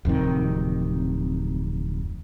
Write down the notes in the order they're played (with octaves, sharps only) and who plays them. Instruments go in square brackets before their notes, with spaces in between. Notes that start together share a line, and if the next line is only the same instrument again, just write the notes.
[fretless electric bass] D1 F2 C3 D#3